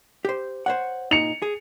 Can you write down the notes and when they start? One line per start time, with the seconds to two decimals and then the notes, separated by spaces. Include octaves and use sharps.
0.25 G4 C5
0.66 C5 C#5 F#5
1.11 A#2 D#4 C#7 F7
1.42 G#4